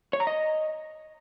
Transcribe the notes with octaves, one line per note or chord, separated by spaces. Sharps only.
C#5
A#5
D#5